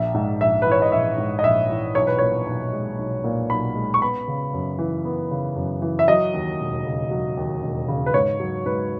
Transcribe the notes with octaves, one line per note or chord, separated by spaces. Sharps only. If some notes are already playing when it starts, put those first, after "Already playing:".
Already playing: A#1 E5
G#2
A#1 E5
E3 B4
C#5
D#5
A#1 E5
G#2
D#5
A#1 E5
E3
B1 C#5
B4
A#2 C#5
B1
G#3
B1
A#2
B1 B5
G#3
C#6
B3 B5
C#3
F#2
E3
B3
C#3
F#2
E3
E5
F#3 D#5
D#2
E1
C#3
F#3
D#2
E1
C#3
B4
G#2 C#5
F#3
G#2 B4